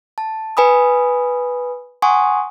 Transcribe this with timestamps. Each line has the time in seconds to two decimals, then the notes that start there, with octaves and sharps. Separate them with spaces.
0.18 A5
0.57 B4 G#5 B5 D#6
2.02 F#5 G#5 C6 C#6 D#6